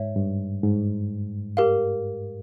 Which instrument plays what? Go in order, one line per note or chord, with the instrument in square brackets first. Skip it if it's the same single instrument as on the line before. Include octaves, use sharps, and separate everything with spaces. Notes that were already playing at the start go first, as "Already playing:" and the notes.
Already playing: [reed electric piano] G#2 [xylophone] C#5 E5
[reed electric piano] G2
G#2
[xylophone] G4 A#4 F5